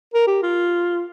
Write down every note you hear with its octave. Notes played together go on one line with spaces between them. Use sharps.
A#4
G4
F4